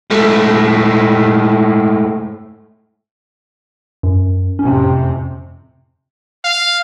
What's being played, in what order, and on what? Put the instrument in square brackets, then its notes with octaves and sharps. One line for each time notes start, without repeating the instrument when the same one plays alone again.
[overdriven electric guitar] G#2 A3
[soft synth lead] F#2
[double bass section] F2 A2 C3 [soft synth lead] C#4
[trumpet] F5